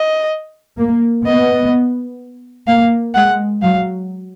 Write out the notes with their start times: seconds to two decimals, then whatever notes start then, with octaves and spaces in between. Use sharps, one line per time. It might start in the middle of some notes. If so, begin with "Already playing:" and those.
Already playing: D#5
0.78 A#3
1.25 B3 D#5
2.67 A#3 F5
3.15 G#3 F#5
3.62 F#3 F5